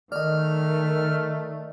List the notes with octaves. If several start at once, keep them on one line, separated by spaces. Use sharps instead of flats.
D#3 A3 D5 D#5 F6